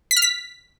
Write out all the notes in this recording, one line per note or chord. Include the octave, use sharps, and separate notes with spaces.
B6
F6
B6